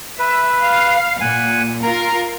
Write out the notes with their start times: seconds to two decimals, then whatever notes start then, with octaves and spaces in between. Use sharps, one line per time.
0.19 B4 E5
0.60 F5
1.21 A#2 F#5 G#5
1.83 F4 A#4 A#5